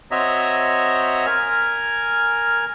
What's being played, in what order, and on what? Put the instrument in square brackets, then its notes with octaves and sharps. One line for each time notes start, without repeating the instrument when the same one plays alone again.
[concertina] C4 F#4 C#5 D#5 E5 A#5
A#4 G#5 F6